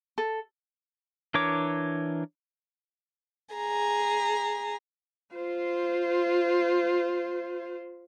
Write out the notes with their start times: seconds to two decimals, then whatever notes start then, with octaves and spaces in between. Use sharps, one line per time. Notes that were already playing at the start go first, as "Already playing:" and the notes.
0.18 A4
1.34 E3 D4 A#4 C#5 D6
3.55 G#4 A#5
5.35 F4 C5